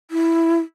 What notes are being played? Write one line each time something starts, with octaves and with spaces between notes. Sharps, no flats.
E4